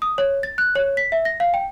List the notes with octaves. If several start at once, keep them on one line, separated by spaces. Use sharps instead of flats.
D#6
C#5
A6
F#6
C#5
B6
E5
A#6
F5
G5